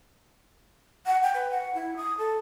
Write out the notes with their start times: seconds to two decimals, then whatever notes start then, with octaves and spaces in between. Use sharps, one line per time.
1.06 F#5
1.23 G5
1.34 B4
1.51 F#5
1.75 E4
1.97 D#6
2.18 A4